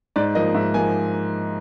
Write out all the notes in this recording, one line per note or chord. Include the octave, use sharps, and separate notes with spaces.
G#2 D5
F3 A#3 D#5
G#2 E5
F3 A#3 G#5